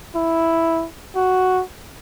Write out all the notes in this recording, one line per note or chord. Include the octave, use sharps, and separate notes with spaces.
E4
F#4